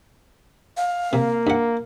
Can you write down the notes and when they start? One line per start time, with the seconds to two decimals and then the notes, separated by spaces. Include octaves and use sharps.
0.77 F5
1.13 C3 A#3
1.47 G2 F#5